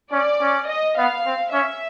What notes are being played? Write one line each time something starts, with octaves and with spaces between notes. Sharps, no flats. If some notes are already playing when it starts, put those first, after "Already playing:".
C#4 D5
C#4
D#5
B3 F5
C4
C#4 E5